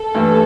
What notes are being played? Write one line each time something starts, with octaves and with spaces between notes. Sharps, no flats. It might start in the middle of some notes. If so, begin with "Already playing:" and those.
Already playing: A4
G2 E3 A3